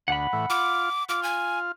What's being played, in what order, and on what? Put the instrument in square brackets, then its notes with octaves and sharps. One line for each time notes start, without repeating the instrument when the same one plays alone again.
[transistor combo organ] D2 [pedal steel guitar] F#5 B5
[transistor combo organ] A2 E3
[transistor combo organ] F4 [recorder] D6
[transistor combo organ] F4 [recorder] D6
[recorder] G#5